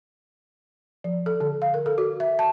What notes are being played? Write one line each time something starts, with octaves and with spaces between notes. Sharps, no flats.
F3
A4
D3
F5
A#4
A4
F#4
E5
A5